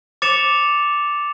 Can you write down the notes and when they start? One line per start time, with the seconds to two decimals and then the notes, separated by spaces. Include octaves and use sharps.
0.22 D6 A6 C#7 E7 F7